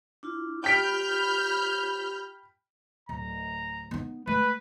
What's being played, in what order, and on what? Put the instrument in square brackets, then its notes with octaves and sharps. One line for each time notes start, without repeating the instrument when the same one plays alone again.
[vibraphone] D4 E4 F4
[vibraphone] F4 G4 [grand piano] G5 B6 D7 [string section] B5 F6 G6
[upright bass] D1 [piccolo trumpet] A#5
[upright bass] B3 D#4
[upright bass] A3 [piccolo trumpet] B4